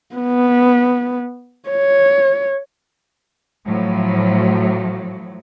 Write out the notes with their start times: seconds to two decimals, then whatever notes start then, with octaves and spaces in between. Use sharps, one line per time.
0.15 B3
1.69 C#5
3.65 A2 F3 F#3